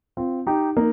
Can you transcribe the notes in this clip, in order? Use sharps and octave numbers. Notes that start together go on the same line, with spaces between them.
C4 F4
D#4 G4
A#3 D#4